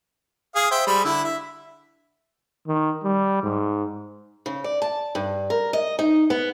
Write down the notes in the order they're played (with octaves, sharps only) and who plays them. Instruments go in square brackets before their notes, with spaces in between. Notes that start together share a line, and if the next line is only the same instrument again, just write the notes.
[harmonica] G#4 F5 D#6
C5 E5 G5
G3 G#3 B5
D3 E4 E6
E5
[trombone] D#3
G3
G#2
[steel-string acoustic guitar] C#3
D5
A5
G2
A#4
D#5
D#4
B3